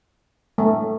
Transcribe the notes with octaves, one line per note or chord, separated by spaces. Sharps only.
A3